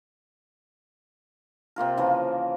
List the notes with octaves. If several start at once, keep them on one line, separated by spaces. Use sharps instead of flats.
C3 A#3 F4 A#4
C#3 E3 F3 A#3